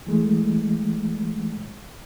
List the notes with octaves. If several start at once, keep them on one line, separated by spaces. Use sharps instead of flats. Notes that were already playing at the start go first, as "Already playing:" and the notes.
E3 G#3 A3